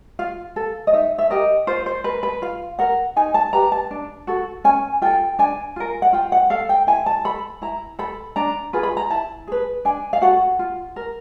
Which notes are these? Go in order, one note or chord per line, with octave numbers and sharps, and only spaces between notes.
F4 F5
A4
D#5
D#4 E5
E5
G4 A#4 D#5
F4 C5
C5
A#4 B4
B4
F4 F5
A#4 F#5
D#4 G#5
A5
G4 B4 A#5
A5
D4
F#4 A4
C#4 G#5
F4 A4 G5
D4 G#5
F4 A#4
F#5
F4 G5
F#5
A4 F5
G5
E4 G#5
A5
A4 B5
E4 A#5
A4 B5
D4 A#5
F4 G#4 B4
B5
A#5
E4 A5
G#4 B4
D4 G#5
F5
F#4 A4 F#5
F4
A#4